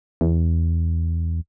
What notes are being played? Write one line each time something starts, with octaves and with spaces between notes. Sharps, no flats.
E2